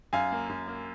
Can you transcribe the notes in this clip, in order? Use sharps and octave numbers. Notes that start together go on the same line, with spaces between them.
F#2 F5 G#5
A#3
F#2
A#3